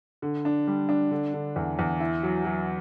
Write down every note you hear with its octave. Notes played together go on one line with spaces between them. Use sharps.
D3
D4
G3
D4
D3
D3
E2
E2
E4
F#3
F#3